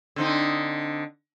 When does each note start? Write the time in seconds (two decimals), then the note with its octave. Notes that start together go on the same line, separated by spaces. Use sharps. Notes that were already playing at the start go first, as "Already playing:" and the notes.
0.16 D3 C4 D#4